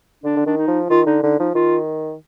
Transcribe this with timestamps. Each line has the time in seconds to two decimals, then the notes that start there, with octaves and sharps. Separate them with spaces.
0.24 D3 D4
0.37 D3
0.46 D#3 D4
0.57 D#4
0.68 F3
0.90 D#3 F4
1.06 D3 D#4
1.23 D3 D#4
1.38 F3 D#4
1.55 D#3 F4